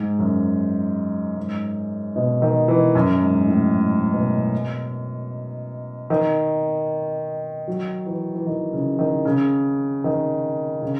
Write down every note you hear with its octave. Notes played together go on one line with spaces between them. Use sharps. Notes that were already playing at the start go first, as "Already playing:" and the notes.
Already playing: G#2
F#2
G#2
B2
D#3
E3
F#2
G#2
A2
G#2
B2
D#3
F#3
E3
E3
D#3
C#3
D#3
C#3
D#3
C#3